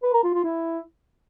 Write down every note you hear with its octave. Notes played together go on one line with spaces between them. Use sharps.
B4
A#4
F4
F4
E4